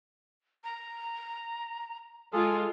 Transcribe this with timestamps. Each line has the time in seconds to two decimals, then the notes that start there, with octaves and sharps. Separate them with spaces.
0.64 A#5
2.33 G#3 F4 G#4 A4